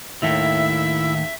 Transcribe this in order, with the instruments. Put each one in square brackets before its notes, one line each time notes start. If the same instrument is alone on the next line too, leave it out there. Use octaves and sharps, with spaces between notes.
[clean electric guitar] D#2 A2 [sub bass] D#3 [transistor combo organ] E4 [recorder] E5